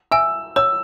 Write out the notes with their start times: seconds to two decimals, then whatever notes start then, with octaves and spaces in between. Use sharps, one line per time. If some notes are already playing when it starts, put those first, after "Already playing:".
0.12 E5 G#5 E6
0.56 C#5 E6